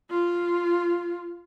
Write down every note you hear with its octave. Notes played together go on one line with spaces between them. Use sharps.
F4